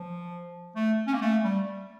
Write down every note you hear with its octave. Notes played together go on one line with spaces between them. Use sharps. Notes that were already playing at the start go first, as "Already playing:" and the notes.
Already playing: F3
A3
C#4
A#3
A3
G3